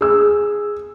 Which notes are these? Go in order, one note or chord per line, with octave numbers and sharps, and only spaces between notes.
G#4 E6